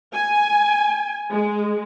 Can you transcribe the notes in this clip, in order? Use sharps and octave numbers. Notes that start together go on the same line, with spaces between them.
G#5
G#3